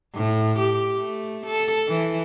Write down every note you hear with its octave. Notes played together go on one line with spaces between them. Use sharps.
A2
G4
A3
A4
E3